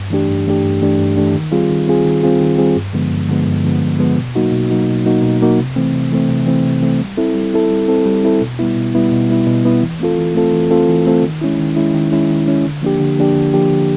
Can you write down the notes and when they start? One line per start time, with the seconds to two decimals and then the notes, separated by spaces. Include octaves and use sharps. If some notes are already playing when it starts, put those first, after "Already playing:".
Already playing: G2
0.10 E3 A3 D4 G4
0.29 G2
0.46 E3 A3 D4 G4
0.64 G2
0.82 E3 A3 D4 G4
0.99 G2
1.17 E3 A3 D4 G4
1.35 D#3
1.52 G3 C4 F4 G#4
1.70 D#3
1.87 G3 C4 F4 G#4
2.05 D#3
2.23 G3 C4 F4 G#4
2.41 D#3
2.58 G3 C4 F4 G#4
2.76 G2
2.93 D3 F3 G#3 B3
3.11 G2
3.29 D3 F3 G#3 B3
3.47 G2
3.64 D3 F3 G#3 B3
3.82 G2
3.99 D3 F3 G#3 B3
4.17 B2
4.35 F#3 A#3 D#4 F#4
4.52 B2
4.70 F#3 A#3 D#4 F#4
4.88 B2
5.05 F#3 A#3 D#4 F#4
5.23 B2
5.41 F#3 A#3 D#4 F#4
5.58 C3
5.76 E3 A3 C4
5.94 C3
6.11 E3 A3 C4
6.29 C3
6.46 E3 A3 C4
6.65 C3
6.82 E3 A3 C4
7.00 G3
7.17 C4 E4 A4
7.35 G3
7.53 C4 E4 A4
7.71 G3
7.88 C4 E4 A4
8.06 G3
8.24 C4 E4 A4
8.41 B2
8.59 G3 B3 E4
8.76 B2
8.94 G3 B3 E4
9.12 B2
9.29 G3 B3 E4
9.47 B2
9.65 G3 B3 E4
9.82 E3
10.00 A3 C4 F4 A4
10.18 E3
10.35 A3 C4 F4 A4
10.53 E3
10.71 A3 C4 F4 A4
10.89 E3
11.06 A3 C4 F4 A4
11.23 D#3
11.41 G#3 C#4 E4
11.59 D#3
11.76 G#3 C#4 E4
11.95 D#3
12.12 G#3 C#4 E4
12.30 D#3
12.47 G#3 C#4 E4
12.65 D3
12.82 F3 A#3 D4 G4
13.00 D3
13.18 F3 A#3 D4 G4
13.35 D3
13.53 F3 A#3 D4 G4
13.71 D3